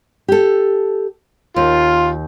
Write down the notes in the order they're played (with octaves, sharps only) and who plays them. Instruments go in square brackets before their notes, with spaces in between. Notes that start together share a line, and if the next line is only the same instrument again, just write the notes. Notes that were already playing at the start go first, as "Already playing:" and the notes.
[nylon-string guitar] G4 A4
[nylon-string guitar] D#2 [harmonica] F4